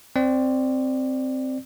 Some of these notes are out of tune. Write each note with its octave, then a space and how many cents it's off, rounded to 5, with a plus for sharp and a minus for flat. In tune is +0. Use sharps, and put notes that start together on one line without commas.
C4 +0 D5 +10